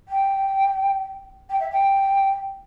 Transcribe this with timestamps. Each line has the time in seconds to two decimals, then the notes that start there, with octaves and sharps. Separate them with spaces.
0.08 G5
1.50 G5
1.60 E5
1.70 G5